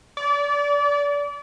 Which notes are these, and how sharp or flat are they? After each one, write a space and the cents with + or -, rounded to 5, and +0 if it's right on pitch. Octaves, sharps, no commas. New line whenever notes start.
D5 -30